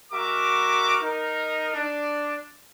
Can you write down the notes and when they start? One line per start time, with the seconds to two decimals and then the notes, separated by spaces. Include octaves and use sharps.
0.12 G#3 F#4 A#4 E5 A#5 D6
1.01 D#4 A#4
1.73 D4